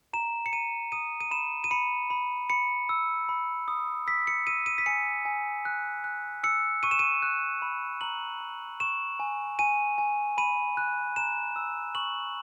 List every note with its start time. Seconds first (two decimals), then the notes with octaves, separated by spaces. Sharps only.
0.13 A#5 E7
0.46 C#7
0.53 A#5 D#7
0.92 D#6 D#7
1.20 D#7
1.31 B5 E7
1.64 D#7
1.71 B5 C#7
2.10 B5
2.50 B5 C#7
2.89 E6
3.29 B5
3.68 D#6
4.07 E6 B6
4.27 C#7
4.47 E6 D#7
4.66 D#7
4.78 B6
4.86 G#5 C#7
5.25 G#5
5.65 F#6
6.04 F#6
6.43 E6 C#7
6.83 C#6 D#7
6.91 E7
6.99 D#7
7.22 F#6
7.62 B5
8.01 A#5 F#7
8.40 A#5
8.80 C#6 E7
9.20 G#5
9.59 G#5 D#7
9.98 G#5
10.38 B5 D#7
10.77 F#6
11.16 A#5 E7
11.56 E6
11.95 C#6 F#7